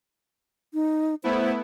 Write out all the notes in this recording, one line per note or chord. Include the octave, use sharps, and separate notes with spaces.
D#4
A3 B3 E4 C5